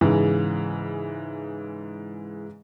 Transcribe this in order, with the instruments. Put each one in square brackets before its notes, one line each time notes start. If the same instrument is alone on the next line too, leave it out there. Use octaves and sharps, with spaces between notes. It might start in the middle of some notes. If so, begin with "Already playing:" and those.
[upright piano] G#2 C#3 E3